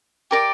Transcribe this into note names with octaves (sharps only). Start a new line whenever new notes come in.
G4 A#4 D5